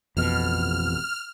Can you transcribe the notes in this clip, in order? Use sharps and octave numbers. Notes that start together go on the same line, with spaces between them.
A1 F2 B2 F6